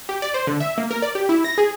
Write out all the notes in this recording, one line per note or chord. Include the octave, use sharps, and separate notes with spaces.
G4
D5
C5
D3
E5
A#3
A#4
D5
G4
E4
A#6
G#4